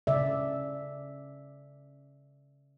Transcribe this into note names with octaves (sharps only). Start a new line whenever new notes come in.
C#3 D5 E5